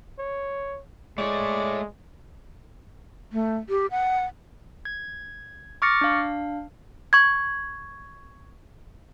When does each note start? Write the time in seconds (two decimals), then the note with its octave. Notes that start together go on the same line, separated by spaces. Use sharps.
0.19 C#5
1.18 G#3 A3 C#5 D5
3.32 A3
3.69 G4
3.91 F#5
4.85 G#6
5.82 C#6 D6 F6 A6 A#6 C#7
6.01 D4 F5
7.13 C#6 G#6